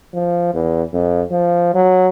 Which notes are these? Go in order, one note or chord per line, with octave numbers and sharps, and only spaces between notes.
F3
E2
F2
F3
F#3